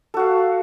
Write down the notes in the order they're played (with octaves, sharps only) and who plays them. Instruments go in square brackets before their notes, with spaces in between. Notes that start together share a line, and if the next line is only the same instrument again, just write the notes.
[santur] A4
F#4
F5